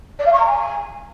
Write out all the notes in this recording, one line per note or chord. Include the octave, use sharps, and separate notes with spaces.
D5
F5
C#6
A#5
G#5